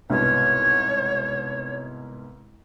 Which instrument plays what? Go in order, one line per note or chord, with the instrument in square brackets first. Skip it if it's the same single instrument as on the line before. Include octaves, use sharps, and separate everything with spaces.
[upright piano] C2 G#2 B2 [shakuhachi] C#5